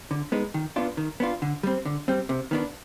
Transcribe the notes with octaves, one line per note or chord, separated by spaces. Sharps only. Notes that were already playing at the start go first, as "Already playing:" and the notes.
D3
G#3 B3 D#4
D#3
B3 D4 F4
D#3
B3 D4 F4
D3
G3 C4
D3
G3 C4
C3
D#3 B3 D4